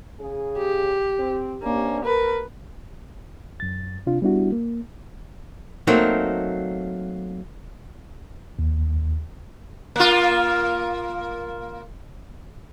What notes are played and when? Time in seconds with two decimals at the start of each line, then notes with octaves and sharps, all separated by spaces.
0.20 C#3 G#4
0.58 G4
1.19 C4
1.63 C3 A#3 C#4 D4
2.05 A#4 B4
3.60 F#2 A6
4.07 C3 D4 F4
4.22 G3 B3 D4 E4 F#4
4.52 A#3
5.87 F#3 A3 A#3 C4 D#4
8.59 D#2
9.96 A#3 F4